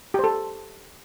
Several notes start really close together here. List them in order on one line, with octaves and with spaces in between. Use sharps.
G4 C5 A4